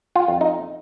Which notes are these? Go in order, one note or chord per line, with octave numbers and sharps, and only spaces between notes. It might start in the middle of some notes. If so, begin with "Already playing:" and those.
F4
F2
D#4